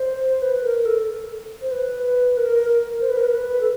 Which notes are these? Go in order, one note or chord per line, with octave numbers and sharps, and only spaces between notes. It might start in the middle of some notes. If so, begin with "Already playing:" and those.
Already playing: C5
B4
A#4
A4
C5
B4
A#4
A#4
C5
B4
A#4
B4
A4